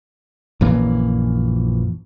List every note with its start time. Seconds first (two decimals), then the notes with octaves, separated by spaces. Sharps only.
0.61 A#1 F#2 E3 A#3